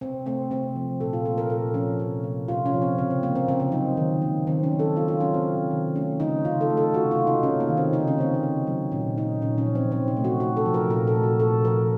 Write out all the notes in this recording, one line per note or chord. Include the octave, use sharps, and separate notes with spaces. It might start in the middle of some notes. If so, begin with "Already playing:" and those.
C3 C4
A3 C4
C3 C4
F3
A#2 A4
F4
A#3 A4
A#4
A#2 A4
F3 C#4
C3
A#3
C3 F4
C#4
F3
C4
C#3 C4
C4
A#3
C4
C#3 C4
C4
F#3 D#4
D#3
A#3
D#3 C4
C#4
F#3
A4
A#3 F4
F4
F#3 C#4
C4
C3
D#3
A3 C#4
C#3 D#4
C#3 F4
A4
A3
A4
C3 F#4
F4
A#3
D#4
C3 C#4
A#3
D#3
C4
C#3 D#4
C#4
A#3 C4
C#4
C#3
F#3
A#2 C#4
A#3 D#4
A#2 C#4
C#4
F3
C4
C3 C4
D#4
A3
F#4
C3 F#4
A4
F3
A#4
A#2 A#4
A4
A3
F#4
A#2 A4
F3 A#4